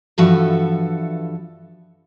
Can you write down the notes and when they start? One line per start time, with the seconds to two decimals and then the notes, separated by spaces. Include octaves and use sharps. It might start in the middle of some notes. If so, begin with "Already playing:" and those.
0.18 G2 E3 F3 F#4 A4 E5